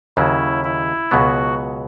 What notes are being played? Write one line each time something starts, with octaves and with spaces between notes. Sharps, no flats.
D#2 C#3 F#3 E4
E4
C#2 B2 F#3 B3 F#4